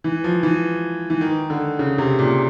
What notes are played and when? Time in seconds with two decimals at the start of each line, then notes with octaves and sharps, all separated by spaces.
0.04 E3
0.24 F3
0.43 E3
1.10 E3
1.21 D#3
1.50 D3
1.79 C#3
1.98 C3
2.19 A#2